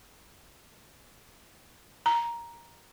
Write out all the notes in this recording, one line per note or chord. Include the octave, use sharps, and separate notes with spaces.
A#5